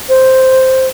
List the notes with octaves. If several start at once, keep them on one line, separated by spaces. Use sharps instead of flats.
C5